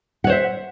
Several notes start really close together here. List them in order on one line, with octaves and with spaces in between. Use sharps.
F#5 C#5 C5 E5